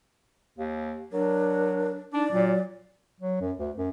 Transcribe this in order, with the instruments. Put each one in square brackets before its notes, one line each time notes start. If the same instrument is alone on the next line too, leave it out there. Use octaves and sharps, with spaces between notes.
[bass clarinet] D#2
[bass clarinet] F#3 [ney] D4 [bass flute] A#4
[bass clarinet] D4 [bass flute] D#4 [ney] D5
[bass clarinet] A#2 [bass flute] F#3
[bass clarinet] F#3
F#2
D2
F#2